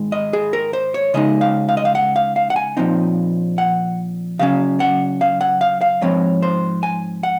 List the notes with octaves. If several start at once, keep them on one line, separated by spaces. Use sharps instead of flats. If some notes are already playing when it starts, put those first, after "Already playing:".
Already playing: G#2 D#3 G#3
D#5
G#4
A#4
C5
C#5
C#3 G#3 D#4 D#5
F5
F5
D#5
F5
F#5
F5
F5
F#5
G#5
A#2 F3 C4 D#4
F#5
C#3 F#3 C#4 F5
F#5
F5
F#5
F5
F5
G#2 F3 C4 C#5
C5
G#5
F#5